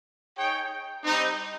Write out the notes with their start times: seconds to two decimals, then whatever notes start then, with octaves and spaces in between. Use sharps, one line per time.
0.37 D#4 G#4 C#5 G5
1.04 G3 C4 D#4